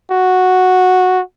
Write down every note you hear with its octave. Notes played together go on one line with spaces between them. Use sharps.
F#4